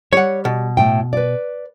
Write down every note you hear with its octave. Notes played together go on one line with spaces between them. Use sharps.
G3 C#5 F#5
B2
A2 G5
B4 D5